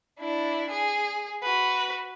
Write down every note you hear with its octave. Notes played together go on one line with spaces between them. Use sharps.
D4 E4
G#4
F#4 B4